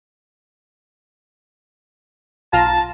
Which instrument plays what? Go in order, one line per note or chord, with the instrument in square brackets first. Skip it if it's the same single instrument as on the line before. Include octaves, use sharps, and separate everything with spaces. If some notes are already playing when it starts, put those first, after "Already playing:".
[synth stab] B1 F4 A#5 [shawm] A5